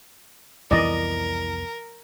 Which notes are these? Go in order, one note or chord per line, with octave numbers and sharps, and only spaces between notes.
C2 F2 E3 B3 A#4 D5 D#5